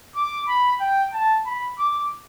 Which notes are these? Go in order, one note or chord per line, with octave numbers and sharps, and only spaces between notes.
D6
B5
G5
A5
B5
D6